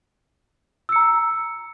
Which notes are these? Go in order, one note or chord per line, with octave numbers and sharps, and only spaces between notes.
A#5 E6 C#7